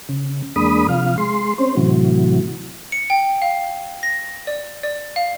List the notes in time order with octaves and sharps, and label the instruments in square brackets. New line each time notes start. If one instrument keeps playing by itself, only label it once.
[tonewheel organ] C#3
E2 G#3 A#3 D4 B5 D#6
C3 F3 F5
G#3 C6
C4 C#4 C5
A2 C3 E3 F#3
[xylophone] C#7
G5
F5
A#6
D5
D5
F5